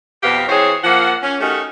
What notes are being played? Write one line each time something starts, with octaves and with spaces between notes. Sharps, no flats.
F2 B2 B3 G4 F5
E3 C4 G#4 C5 C#5
F3 A#3 F#5
C#4
A3 C#4 D#4 F#4 G4 A#4